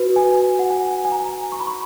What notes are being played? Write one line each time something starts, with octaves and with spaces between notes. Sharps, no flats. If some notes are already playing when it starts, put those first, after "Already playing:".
Already playing: F#4 B4
G#5
F#5
G#5
G#5
A#5
C#6
B5
C#6